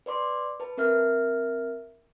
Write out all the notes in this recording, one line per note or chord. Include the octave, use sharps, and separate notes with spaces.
B4 D5 C6 D6
B4 A5
C4 A#4 E5 F6